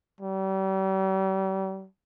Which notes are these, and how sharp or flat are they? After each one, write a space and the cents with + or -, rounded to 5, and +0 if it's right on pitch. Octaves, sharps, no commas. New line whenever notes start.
G3 -40